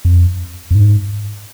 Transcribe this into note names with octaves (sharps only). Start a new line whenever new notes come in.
F2
F2
G#2